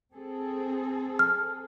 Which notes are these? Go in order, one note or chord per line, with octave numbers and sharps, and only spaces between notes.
C4 G#4 A4
F6